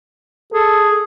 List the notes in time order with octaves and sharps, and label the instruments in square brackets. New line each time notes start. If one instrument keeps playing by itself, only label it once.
[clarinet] G#4 [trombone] A4